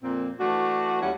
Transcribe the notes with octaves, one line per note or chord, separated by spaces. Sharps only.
F2 A#2 A#3 C4
E3 A3 D4 F#4
D#2 G3 A3 C#4 E4 F#5